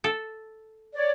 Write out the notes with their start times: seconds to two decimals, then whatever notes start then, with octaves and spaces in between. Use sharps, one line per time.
0.04 A4
0.95 C#5 D5